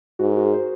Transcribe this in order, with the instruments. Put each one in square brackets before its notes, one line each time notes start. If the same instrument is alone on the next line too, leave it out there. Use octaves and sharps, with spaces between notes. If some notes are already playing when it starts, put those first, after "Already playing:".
[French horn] G#2 [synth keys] F#4
[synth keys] A#4
F#4
G#4
C5